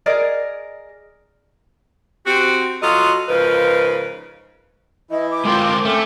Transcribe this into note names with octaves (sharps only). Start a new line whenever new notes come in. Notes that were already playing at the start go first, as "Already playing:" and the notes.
G#4 A#4 D5 D#5
C4 F#4 G4
F#3 F4 F#4 A4 D#5
G#2 C#3 F3 D#4 A#4 B4
E3 E4 D#5
D6
G#3 C4 F4 A#4 C5
A3 C4 C#4